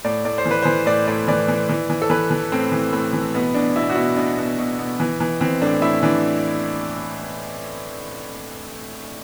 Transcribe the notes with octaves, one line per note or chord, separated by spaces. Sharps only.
A2 D5
A2 D5
C5
E3
B4
E3 C5
A2 D5
A2 D5
E3 D5
E3
E3
E3
A4
E3 B4
E3
A2 C4
E3
A2
E3
B2 B3
B2 D4
B2 E4
F#4
B2 E4
B2 D4
B2
B2
B2
E3
E3
E3 C4
A2 D4
A2 E4
E3 D4